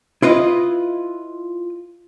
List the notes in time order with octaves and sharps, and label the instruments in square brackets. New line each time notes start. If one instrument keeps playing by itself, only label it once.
[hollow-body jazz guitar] E4 F4 B4 D#5